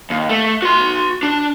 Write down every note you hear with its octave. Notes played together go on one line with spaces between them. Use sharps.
D#2
A3
F#4 C6
D4